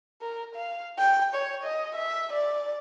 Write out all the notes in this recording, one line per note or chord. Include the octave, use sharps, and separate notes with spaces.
A#4
F5
G5
C#5
D#5
E5
D5